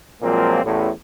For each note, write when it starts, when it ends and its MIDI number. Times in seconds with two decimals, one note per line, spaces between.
0.22 0.62 46
0.22 0.62 53
0.22 0.62 54
0.22 0.62 56
0.22 0.62 58
0.22 0.62 60
0.63 0.89 33
0.63 0.89 40
0.63 0.89 45